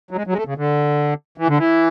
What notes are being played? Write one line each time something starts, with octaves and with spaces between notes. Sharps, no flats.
F#3
G#3
F#3
G#3
A3
C#3
D3
E3
D3
E3